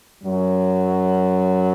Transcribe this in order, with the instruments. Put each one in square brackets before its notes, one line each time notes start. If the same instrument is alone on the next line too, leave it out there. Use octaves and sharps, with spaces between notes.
[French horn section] F#2 F#3